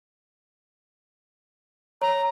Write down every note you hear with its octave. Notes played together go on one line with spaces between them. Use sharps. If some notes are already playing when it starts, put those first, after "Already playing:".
C#5 A#5